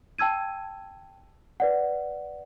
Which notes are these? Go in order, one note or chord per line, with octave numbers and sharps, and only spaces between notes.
G5 A5 E6 G#6 D#7
B4 D5 F#5